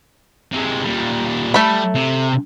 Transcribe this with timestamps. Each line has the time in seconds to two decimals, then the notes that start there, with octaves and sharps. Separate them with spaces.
0.52 C3 G#3
0.85 A#2 G3
1.54 G3 A3 B5
1.95 C3